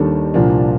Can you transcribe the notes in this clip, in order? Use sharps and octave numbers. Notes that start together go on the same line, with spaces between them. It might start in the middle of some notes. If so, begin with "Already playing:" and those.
Already playing: D#2 D#3 G3 D4 A4
C2 A#2 F3 A#3 D4